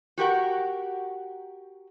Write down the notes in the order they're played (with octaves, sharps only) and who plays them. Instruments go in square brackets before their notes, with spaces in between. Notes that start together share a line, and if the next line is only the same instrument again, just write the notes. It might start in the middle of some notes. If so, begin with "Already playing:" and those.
[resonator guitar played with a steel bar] F#4 G4 A#4 F#5